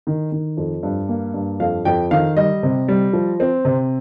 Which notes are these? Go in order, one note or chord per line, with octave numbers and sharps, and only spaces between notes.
D#3
D#3
F2
G2
A#3
G2
F2 F5
F2 G5
D#3 F5
G3 D#5
C3
G3
F3
C4
C3